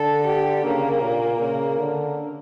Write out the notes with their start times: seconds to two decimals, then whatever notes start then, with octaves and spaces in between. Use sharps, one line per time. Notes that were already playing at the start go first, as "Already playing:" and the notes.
Already playing: D3 A4
0.26 G4
0.64 C#3 A#3
1.02 A#2
1.40 C#3 A#3
1.78 D3